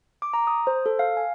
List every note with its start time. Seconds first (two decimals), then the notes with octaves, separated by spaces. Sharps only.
0.22 D6
0.34 A#5
0.47 D#6
0.67 C5
0.86 A4
0.99 F5
1.17 G#5